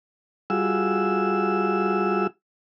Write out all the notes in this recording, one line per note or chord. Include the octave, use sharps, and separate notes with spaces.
G3 F4 F#4 G#4 E6